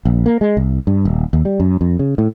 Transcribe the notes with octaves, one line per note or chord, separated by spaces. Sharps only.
A#1
A#3
G#3
C2
G2
D#1
D#2
G3
F#2
F2
C#3
A2